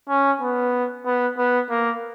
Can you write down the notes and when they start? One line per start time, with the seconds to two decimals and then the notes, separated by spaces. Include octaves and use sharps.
0.09 C#4
0.41 B3
1.05 B3
1.37 B3
1.70 A#3